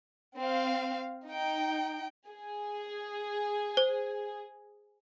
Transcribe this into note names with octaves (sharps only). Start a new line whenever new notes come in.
C4 F5
D#4 G5
G#4
C5